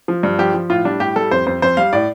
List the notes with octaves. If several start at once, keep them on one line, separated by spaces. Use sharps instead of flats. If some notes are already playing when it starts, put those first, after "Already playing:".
F3
G2
F3 G4
F3
A2 F4
G3 D4
A2 G4
G3 A4
F2 C5
F2 C5
F2 C5
G3 F5
A2 D5